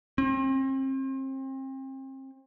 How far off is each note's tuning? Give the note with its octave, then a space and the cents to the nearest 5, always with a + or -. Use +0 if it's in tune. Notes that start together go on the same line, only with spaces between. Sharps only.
C4 +35